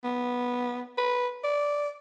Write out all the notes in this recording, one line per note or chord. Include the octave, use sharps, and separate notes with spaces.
B3
B4
D5